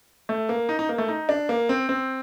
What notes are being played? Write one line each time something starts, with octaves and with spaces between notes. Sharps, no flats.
A3
A#3
D#4
D#4
A#3
A3
D#4
D4
A#3
C4
C4